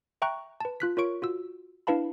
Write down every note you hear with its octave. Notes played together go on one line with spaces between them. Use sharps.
E5 G5 A#5 C#6 F#6
B4 A5
F4 F#6 B6
F4 A#4 C#5 C#6 D7
F4 F#4 E6
D4 E4 B4 F5 A5 B5